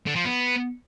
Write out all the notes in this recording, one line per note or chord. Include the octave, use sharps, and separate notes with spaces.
D3
F3
B3